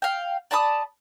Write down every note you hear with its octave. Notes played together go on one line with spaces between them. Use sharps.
F5 G5
D5 A5 B5 D#6